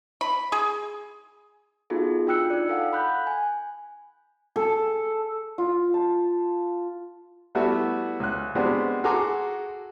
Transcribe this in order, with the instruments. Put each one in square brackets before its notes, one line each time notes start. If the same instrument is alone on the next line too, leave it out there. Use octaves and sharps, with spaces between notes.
[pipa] B5
G#4
[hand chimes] B3 D#4 F4 F#4 G#4 A4
D4 F4 G5 E6 F#6 C#7
D#4 D5
A4 F5 F#5
B5 F#6 G6
G#5
[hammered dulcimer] A4
[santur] F4
A5
[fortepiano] G3 A3 B3 E4 F#4
C#2 F#6
G#3 B3 C4 D4 F#4 G4
F#4 G#4 A4 A#5 C6 D6